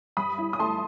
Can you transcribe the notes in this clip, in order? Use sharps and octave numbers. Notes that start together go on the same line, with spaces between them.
G2 B5 D#6
E4
D#6
A3 A5 C6